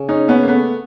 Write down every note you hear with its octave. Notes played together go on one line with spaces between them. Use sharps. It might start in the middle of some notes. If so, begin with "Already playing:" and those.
Already playing: C#3
C#4 D#4
B3 C#4
A#3
A3 B3